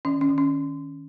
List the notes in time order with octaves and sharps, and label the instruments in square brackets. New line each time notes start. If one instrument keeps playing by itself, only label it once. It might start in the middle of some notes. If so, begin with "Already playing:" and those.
[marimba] D#3 C#4
C#4
D#3
C#4